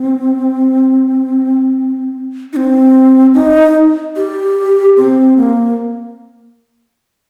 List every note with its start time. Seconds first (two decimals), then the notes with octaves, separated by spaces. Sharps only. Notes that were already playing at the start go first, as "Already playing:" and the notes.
Already playing: C4
2.53 D#4
2.56 C4
3.34 D#4
4.16 G4
4.97 C4
5.37 A#3